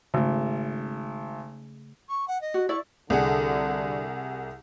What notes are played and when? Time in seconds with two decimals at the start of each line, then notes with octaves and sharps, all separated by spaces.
0.14 G#1 C#3 A3
2.09 C#6
2.28 F#5
2.41 D#5
2.54 F#4
2.69 E4 D5 C#6
3.10 C2 D3 G#4 F#5